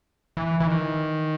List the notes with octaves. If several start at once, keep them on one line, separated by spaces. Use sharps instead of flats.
E3
E3
D#3